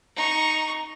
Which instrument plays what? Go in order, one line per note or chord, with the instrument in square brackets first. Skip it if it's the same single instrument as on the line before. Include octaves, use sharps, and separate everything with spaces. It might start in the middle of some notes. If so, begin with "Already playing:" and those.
[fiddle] D#4 C#6